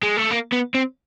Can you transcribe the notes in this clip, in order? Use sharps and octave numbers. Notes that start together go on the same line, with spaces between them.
G#3
A3
A#3
B3
C4